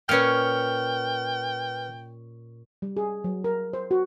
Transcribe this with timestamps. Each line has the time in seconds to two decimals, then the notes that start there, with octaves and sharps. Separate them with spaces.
0.09 A#2 C#4 B4 G5 F6
2.82 G3
2.97 G#4
3.24 F#3
3.44 A#4
3.73 C5
3.91 F#4